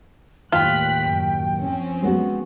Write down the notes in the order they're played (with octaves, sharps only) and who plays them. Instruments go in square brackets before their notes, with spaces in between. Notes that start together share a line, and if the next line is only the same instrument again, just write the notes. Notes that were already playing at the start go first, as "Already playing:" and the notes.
[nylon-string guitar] D#2 A2 [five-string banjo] F4 [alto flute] G5 [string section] F#6 B6
[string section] F#2
F3 C4 C#4
[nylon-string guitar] G#3 B3 F#4